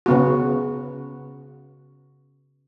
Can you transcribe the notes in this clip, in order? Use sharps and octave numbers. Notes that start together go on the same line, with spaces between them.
C#3 B3 F#4